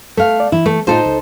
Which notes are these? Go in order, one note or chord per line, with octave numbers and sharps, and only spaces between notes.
A3 A4 F5
D5
E3 E4
A3
A2 D#4 F4 A4 C5 A5
C#2